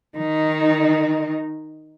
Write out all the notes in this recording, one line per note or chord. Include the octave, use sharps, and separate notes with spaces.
D#3 D#4